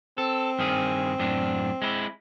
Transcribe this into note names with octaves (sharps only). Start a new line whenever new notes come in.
C4 A4
G2 D#3 G#4
F#2 A2 D4
G#3 E4